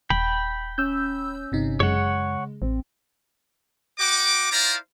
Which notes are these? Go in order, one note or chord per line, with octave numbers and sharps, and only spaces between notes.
D#1 G5 B5
C#4 E6 G6
G1 C3 D#4
F#2 C#3 G#3 C#5 F#5
A1 C4
F#4 D#5 G5 D6
E4 F4 C5 D5 F5 A#5